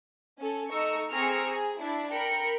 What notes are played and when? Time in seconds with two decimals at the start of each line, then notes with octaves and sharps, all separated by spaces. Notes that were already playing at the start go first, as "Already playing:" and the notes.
0.39 C#4 A4
0.70 A3 D#4 A#5 C#6 E6
1.11 C4 G#4 A#5 C#6 E6 F6
1.46 G#4
1.80 D4 E4 A5
2.12 A#4 G5 B5 C#7